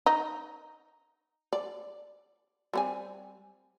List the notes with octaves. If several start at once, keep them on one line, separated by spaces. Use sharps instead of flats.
D#4
D5
G3 C4 G#5